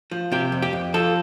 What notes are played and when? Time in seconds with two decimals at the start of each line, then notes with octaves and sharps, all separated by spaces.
0.11 F3
0.32 C3 G4
0.52 F2
0.62 G4
0.73 F2
0.94 F3 A4